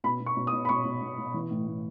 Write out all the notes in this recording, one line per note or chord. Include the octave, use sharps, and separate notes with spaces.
B2 B5
B2
C#6
B2
D#6
B2
B5
B2 C#6
B2
B2
B2
E3
A2
A2